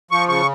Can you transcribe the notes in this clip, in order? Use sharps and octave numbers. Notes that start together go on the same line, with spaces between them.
F3 C#6
C#3 C#6